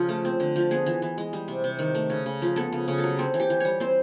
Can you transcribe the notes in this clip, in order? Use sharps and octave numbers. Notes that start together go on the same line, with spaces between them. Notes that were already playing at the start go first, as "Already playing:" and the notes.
Already playing: C#3 F3
A3
C4
D3
F3
B3 G#4
E3
E3
G#3
G3
C3
C3
D#3
A3
C#3
C#3
F3
B3 A4
C#3
C#3
A4
F#3
C4 A4
E3
G4
E3
G3 C#5
C4 C5